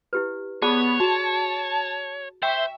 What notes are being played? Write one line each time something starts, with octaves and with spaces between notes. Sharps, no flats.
E4 G4 B4
B3 G#4 C#5 D5 A5
F#4 A5
C5 E5 G5 C#6